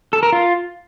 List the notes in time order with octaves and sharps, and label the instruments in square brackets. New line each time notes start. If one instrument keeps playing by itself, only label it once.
[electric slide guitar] A4
A#4
F4